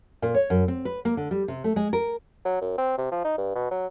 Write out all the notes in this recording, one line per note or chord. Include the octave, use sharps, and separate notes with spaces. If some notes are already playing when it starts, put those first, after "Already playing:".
A#2
C#5
F#2
C4
B4
A#3
D3
G3
C3
A3
G#3
A#4
F#3
F#2
C4
C3
F3
D#4
G2
B2
F#3